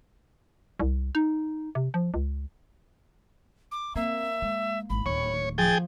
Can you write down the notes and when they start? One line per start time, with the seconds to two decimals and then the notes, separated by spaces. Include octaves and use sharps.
0.80 C2
1.15 D#4
1.75 C3
1.94 F3
2.14 C#2
3.72 D6
3.96 A#3 C4 E5
4.42 G#3
4.90 G#1 E2 B5
5.06 D1 D#3 C#5 C#6
5.58 F3 G#4 G5 A6